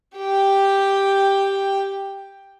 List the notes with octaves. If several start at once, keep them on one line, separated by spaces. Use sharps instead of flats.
G4 G5